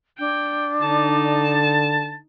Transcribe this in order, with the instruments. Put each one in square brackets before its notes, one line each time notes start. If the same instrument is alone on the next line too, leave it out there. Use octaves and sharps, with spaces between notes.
[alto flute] D4 [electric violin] G5
[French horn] D3 [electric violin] D#4 [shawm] A5